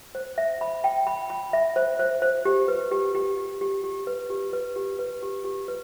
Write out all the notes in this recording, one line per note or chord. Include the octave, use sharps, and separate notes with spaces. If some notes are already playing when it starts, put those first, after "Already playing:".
C5
E5
B5
G5
B5
B5
E5
C5
C5
C5
G4
B4
G4
G4
G4
G4
G4
B4
G4
B4
G4
B4
G4
G4
B4